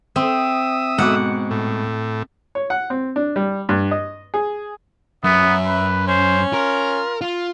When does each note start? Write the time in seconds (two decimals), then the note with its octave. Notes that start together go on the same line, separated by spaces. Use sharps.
0.16 C4 E5 D#6
0.98 G#2 B2 F#5 D6
1.51 A2
2.55 C#5
2.70 F#5
2.90 C4
3.16 D4
3.36 G3
3.69 G2
3.91 D#5
4.34 G#4
5.24 F#2 B3 E5
5.66 B4
6.08 C#4 C5
6.53 F4 A#4
7.21 F4